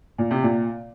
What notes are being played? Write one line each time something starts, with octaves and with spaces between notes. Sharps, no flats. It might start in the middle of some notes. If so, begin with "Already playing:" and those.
A#2
C3
A#2